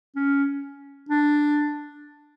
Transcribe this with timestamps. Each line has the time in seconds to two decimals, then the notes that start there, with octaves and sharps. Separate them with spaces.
0.16 C#4
1.09 D4